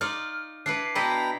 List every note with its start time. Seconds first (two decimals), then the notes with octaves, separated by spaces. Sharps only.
0.01 D#4 F4 D5 F6
0.66 D4 E4 B4 F#6 C7
0.95 B2 D4 E4 D5 D#5 G5 A#5 B5